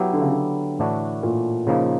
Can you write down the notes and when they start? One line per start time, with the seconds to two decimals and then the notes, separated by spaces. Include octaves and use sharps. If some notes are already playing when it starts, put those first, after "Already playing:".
Already playing: F#3 B3 E4 G4
0.13 D3
0.22 C#3
0.31 D3
0.79 A2 E3 A3 D4 F#4
1.23 A#2
1.67 C#3 F3 A#3 D#4